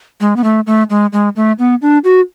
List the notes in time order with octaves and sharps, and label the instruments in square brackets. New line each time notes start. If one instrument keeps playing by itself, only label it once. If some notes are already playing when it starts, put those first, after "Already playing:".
[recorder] G#3
B3
A3
A3
G#3
G#3
A3
B3
D4
F#4